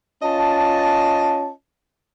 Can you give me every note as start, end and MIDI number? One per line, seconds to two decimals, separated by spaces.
0.22 1.52 61
0.22 1.52 65
0.22 1.52 75
0.22 1.52 81